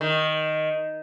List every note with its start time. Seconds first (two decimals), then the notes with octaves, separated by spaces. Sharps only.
0.01 D#3